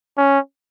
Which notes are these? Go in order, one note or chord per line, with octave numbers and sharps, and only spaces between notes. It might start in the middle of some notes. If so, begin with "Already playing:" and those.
C#4